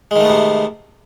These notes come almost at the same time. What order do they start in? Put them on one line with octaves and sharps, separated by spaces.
G#3 D#3 A3 B3 C3